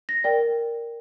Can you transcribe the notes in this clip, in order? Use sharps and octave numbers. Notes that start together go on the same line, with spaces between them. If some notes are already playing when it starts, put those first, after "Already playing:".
A#6
A#4 D5 G5